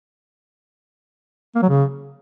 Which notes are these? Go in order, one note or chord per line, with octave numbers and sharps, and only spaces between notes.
A#3
F#3
C#3